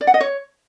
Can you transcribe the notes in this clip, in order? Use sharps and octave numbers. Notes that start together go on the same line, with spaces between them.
D5
F#5
D#5
C#5